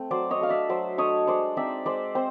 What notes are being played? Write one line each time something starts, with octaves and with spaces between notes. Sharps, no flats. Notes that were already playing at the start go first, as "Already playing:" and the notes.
Already playing: A3 C4
F#3 C5 D5
C#5 D#5
A3 D4 F5
D5 E5
F#3 C5 D5
A3 D4 C#5 D#5
G#3 C5 D5
C4 D#4 D5 E5
G#3 C5 D5
C4 C5